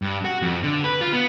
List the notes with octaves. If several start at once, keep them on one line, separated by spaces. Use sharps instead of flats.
G2
F#4
F2
D3
B4
F4
B3